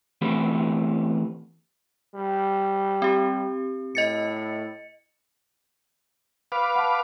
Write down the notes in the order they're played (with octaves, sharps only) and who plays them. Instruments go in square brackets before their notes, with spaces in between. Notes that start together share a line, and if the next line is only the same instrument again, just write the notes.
[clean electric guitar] E3 A3 B3 C4 G4 B4
[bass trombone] G3
[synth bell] C4 G4
[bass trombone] A2 [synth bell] D#5 A6 C#7
[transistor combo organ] B4 F5 D6
[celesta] F#5 A5